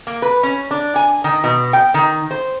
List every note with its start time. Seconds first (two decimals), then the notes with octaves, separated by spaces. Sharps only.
0.07 A#3
0.22 B4
0.43 C#4
0.71 D4
0.96 G#5
1.24 D#3
1.44 B2
1.73 G5
1.94 D#3
2.31 C5